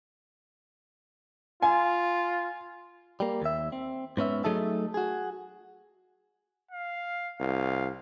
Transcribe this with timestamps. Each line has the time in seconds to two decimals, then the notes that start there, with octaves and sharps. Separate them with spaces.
1.62 F4 G#5
3.20 G3 A#3
3.42 D#2 E5
3.72 C4
4.17 G#2 B3 C#4 E5
4.44 F#3 A3 D#4 G#4 A4 E5
4.94 F#4 G#4
6.71 F5
7.40 C2 F5